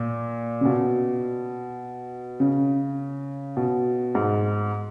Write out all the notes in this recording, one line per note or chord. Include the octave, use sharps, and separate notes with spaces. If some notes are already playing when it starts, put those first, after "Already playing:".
Already playing: A#2
C#3
B2
C#3
B2
G#2